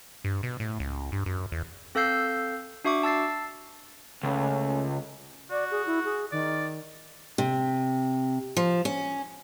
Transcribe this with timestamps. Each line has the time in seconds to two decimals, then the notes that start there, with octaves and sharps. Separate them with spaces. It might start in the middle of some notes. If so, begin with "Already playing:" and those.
0.24 G2
0.43 B2
0.60 A2
0.80 C#2
1.12 G2
1.26 F#2
1.52 E2
1.95 C4 A4 F5 E6 G6 C7
2.85 D4 F#4 E5 C#6 D6
3.03 A5 E6 A6 C7
4.23 C#2 A3 C#4
5.50 F#4 D5
5.71 G#4
5.87 E4
6.05 G#4
6.32 D#3 D5
7.38 C3
8.57 F3
8.85 C#4